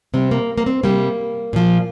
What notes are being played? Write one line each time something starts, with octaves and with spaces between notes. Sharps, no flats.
C3 G3 C4
A#3
A#3
C4
C3 G3 A#3
A#2 F3